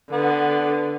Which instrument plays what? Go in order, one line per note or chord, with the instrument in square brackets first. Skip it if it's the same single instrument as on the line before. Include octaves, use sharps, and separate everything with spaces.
[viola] D3 [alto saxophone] B3